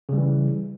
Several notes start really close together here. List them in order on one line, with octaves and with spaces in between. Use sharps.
C#3 G3 E3